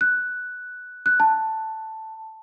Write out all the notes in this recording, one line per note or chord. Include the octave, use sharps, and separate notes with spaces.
F#6
F#6
A5